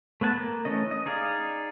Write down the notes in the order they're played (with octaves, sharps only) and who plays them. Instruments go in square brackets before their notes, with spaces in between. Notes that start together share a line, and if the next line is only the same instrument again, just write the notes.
[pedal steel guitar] A3 B3 F#5 G#5 A5
A#3
E3 A3 C#4 D#5
D#5
D#4 G#4 D5 F5